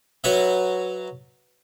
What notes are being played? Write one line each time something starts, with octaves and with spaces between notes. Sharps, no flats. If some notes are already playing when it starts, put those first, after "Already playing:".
F#3 B4 C#5 E5